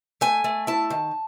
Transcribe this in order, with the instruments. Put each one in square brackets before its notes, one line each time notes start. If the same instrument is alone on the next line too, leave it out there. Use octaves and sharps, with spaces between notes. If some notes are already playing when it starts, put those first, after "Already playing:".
[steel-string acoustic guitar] A3 G#5
A3
E4 A5
D#3